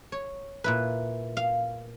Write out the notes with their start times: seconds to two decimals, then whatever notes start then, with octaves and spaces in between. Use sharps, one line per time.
0.12 C#5
0.64 A#2 E4 B4
1.37 F5